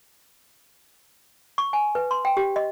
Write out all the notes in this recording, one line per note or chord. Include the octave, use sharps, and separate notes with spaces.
C#6
G#5
B4
C6
G5
G4
D#5